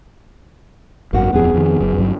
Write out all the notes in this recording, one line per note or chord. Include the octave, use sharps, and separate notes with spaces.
G#1 F#2 A#3 F#4
D#1 F2 B3 G#4
F2 D#3
F#1 F#2
G1 G2 F#3